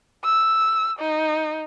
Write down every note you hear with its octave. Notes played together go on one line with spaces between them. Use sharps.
E6
D#4